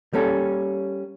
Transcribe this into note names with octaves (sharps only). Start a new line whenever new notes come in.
G3 A#3 C#4 A4